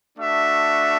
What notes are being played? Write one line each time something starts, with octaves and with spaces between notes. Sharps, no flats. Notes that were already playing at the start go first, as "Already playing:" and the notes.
A3 D4 F#4 E5